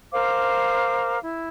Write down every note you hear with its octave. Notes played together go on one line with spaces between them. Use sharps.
A#4 C5 F5 D6
E4